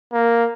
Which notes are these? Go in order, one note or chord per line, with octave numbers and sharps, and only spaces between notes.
A#3